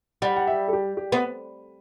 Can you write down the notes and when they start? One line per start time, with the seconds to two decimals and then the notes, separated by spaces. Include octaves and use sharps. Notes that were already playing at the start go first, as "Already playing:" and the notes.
0.22 G3 F#5
0.36 F#5
0.47 E5
0.68 A4
0.73 G4
0.97 G4
1.12 B3